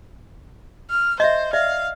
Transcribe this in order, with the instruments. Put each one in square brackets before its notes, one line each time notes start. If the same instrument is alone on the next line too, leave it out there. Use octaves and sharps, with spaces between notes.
[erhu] F6
[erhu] C5 [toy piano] D#5 E5
[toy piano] D5 E5 [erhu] F5